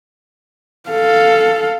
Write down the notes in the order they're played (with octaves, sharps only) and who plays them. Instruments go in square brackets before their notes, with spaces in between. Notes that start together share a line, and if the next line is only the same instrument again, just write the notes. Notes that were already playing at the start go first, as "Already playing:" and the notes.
[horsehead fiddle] A4 F5